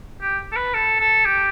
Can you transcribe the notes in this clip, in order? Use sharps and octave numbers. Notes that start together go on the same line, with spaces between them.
G4
A4
B4
A4
A4
G4